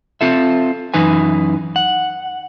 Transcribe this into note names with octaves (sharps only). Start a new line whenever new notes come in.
C4 F4 A4 E5
F#2 E3 D#4 B4 G#5
F#5